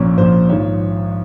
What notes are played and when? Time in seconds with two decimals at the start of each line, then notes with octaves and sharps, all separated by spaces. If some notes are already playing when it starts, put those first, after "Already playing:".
Already playing: A#1 A#2 F3 C#4
0.18 A#1 A#2 F3 C5
0.49 G#1 G#2 F3 C#5